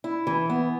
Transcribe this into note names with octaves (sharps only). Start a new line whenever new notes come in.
E4
E3
B3